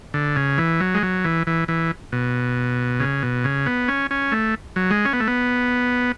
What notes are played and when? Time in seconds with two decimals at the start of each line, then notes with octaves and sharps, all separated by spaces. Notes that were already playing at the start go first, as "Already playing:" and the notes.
0.14 D3
0.36 C#3
0.58 E3
0.80 F#3
0.94 G#3
1.03 F#3
1.25 E3
1.47 E3
1.68 E3
2.12 B2
3.00 C#3
3.23 B2
3.44 C#3
3.66 B3
3.88 C#4
4.11 C#4
4.32 A3
4.76 F#3
4.91 G#3
5.05 C#4
5.13 B3
5.20 A3
5.28 B3